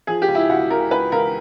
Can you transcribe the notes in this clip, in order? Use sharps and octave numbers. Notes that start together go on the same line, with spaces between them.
F3 G#4
G4
C#2
E4
C#2 F#4
C#2 A#4
C#2 B4
C#2 A#4